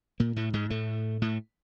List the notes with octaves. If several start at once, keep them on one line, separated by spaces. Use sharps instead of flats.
A#2 A#3
A2 A3
G#2 G#3
A2 A3
A2 A3